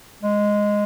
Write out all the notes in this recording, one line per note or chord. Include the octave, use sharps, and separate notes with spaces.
G#3